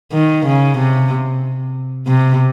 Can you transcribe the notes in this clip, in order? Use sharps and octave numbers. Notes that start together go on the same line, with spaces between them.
D#3
C#3
C3
C3